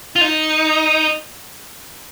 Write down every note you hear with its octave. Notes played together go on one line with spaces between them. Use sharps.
F4
D#4